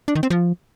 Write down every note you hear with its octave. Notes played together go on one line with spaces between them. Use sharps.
D4
D#3
C4
F3